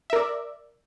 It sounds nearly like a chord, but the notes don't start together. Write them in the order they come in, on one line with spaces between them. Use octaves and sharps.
E5 A#4 D5